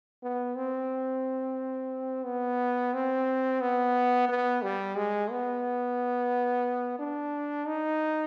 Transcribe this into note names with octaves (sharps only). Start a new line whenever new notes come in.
B3
C4
B3
C4
B3
B3
G3
G#3
B3
D4
D#4